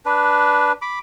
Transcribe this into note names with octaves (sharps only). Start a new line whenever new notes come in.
D4 B4
B5 D6